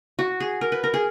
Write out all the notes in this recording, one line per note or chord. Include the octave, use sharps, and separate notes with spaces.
F#4
G#4
A#4
B4
A#4
G#4